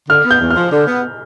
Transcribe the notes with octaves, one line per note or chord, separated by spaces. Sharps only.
D3 F6
B3
G6
E2
F6
F3
D3
B3